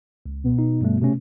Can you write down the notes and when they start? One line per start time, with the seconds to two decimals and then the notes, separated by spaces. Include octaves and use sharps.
0.26 C#2
0.43 B2
0.59 D#4
0.81 G2 G3 A3
1.02 C3 A3 C#4